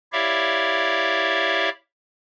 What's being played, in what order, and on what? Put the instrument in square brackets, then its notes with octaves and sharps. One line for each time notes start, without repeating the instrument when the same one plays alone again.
[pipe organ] E4 G4 C#5 D5 E5 F5